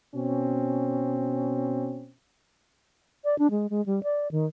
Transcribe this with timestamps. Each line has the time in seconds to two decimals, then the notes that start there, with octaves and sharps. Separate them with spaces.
0.15 B2 C4 C#4
3.24 D5
3.39 D4
3.51 G#3
3.70 G#3
3.86 G3
4.03 D5
4.31 D#3